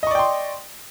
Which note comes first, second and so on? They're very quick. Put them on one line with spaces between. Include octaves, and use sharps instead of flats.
D#5 C#6 D5 G5 C6